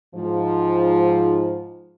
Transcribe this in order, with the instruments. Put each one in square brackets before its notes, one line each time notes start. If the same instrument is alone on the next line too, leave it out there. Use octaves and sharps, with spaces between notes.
[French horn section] G#2 F3